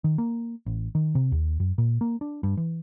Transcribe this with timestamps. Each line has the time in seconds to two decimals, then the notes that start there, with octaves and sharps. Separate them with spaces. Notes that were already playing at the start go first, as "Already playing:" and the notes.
0.04 D#3
0.18 A#3
0.66 A1
0.95 D#3
1.15 C3
1.32 D#2
1.60 F#2
1.78 A#2
2.01 A#3
2.21 D4
2.43 G2
2.57 E3